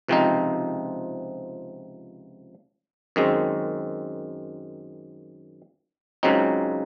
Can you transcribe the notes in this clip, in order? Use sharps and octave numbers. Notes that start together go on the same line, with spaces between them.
C#2 C3 F3 C4 D#4
F#2 D#3 G#3 C4
C#2 C#3 F#3 C4 D#4